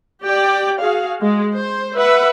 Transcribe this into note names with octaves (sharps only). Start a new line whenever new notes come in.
G4 D5 G5
F#4 G#4 F5
G#3
C5
B4 E5 F#5